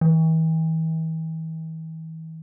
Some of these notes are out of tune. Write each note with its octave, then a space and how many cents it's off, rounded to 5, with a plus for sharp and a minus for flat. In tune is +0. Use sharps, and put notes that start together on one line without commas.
E3 -40